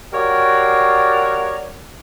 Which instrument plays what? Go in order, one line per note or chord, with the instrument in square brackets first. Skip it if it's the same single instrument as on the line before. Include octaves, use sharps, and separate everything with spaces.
[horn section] F#4 G4 A#4 C#5 D5 F5